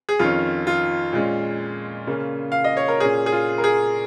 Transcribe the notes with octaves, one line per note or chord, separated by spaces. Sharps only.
G#4
F2 D#3 C#4 F4
F4
A#2 G#3 C#4
C#3 A#3 C#4
F5
D#5
C#5
A#4
A#2 A#3 C#4 G#4
G#4
F4
A#4
G#4